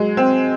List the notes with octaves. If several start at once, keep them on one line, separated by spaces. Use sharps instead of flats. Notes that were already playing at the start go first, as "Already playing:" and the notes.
Already playing: F#3 G#3
C4